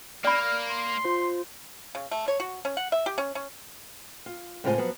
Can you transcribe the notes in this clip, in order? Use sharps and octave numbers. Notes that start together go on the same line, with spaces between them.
A#3 D5 B5 F6
C6
F4 C5
C#3
A3
C#5
F#4
C#4
F#5
E5
G4
C#4
C#4
F4
A2 C#3 G#3 F4 C5 G#5
F3 F#3 B3